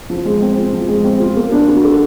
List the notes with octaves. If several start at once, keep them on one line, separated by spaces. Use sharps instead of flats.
F3
G#3
C4
F4
F3
G#3
C4
F4
A#3
D4
F#4
A4